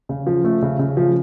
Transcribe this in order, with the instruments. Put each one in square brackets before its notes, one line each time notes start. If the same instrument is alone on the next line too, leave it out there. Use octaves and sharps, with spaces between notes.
[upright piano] C#3
F3
A3
C#3
C#3
F3